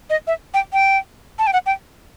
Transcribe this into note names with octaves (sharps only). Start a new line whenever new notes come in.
D#5
E5
G5
G5
A5
G5
F#5
G5